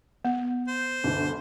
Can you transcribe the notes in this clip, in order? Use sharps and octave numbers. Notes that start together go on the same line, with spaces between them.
B3
C5
G1 D2